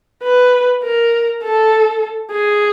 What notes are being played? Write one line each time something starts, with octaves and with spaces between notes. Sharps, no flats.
B4
A#4
A4
G#4